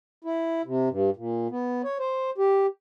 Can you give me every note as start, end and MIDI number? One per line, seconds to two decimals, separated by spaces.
0.24 0.62 64
0.65 0.89 48
0.89 1.10 43
1.17 1.48 46
1.51 1.82 59
1.84 1.98 73
1.99 2.30 72
2.38 2.66 67